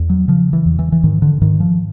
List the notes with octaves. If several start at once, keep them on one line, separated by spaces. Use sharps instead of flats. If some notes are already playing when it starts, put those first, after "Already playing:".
Already playing: E2
F#3
C#3 F3
E3
E2
E3
E3
G#2 D#3
D3
G#2 D#3
F3